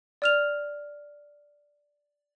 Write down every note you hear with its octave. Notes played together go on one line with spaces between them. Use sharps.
D5 F6 F7